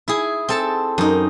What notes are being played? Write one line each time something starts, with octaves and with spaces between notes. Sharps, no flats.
E4 G#4
C4 A4 A5
F#2 D#4